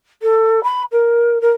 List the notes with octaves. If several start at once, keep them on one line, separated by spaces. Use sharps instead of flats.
A4
B5
A#4
A#4